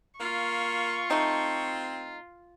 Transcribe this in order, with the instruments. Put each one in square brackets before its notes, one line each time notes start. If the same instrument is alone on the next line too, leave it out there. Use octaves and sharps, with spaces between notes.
[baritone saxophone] A#3 [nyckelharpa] F4 [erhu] C#6
[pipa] A3 D#4 [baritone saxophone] C4